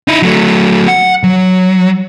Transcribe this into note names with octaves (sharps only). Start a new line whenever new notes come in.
D#4 E4
F#3 A3
F#5
F#3